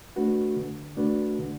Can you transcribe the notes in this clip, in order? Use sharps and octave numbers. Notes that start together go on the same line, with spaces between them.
A3 D4 F#4 B4
D3
A3 D4 F#4 B4
D3